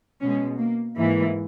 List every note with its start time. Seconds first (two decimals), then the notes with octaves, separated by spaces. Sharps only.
0.21 B2 G#3 C#4
0.58 A#3
0.95 G#2 E3 A#3